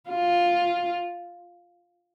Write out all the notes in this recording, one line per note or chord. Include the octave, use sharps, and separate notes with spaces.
F4